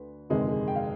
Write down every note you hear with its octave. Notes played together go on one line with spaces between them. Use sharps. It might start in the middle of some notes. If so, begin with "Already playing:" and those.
Already playing: D2 B4
G1 F2 C3 D#3 G#3 G#4
G#4
G5
F5